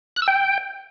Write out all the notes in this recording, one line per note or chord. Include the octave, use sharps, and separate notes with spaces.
F#6
E6
G5